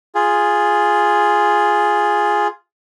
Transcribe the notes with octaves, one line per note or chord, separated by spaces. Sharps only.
F4 G#4